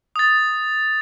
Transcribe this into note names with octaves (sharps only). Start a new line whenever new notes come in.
D#6 A6